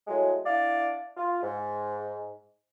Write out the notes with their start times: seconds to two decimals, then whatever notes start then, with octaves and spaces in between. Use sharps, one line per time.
0.08 A2 F#3 G#3
0.46 D4 E4 D5 F5
1.16 F4
1.43 G#2